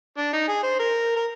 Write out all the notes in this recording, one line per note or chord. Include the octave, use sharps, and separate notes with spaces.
D4
D#4
G#4
C5
A#4
A#4